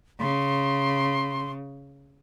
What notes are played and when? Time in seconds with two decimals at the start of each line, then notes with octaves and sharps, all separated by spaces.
0.20 C#3 C6